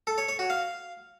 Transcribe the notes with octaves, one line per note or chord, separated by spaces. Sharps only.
A4
C#5
C#5
F#4
F5